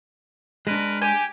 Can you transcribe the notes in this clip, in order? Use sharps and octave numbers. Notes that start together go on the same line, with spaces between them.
G#3 D4 A#4 B4
G4 G#5